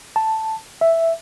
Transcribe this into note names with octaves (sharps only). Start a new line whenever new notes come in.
A5
E5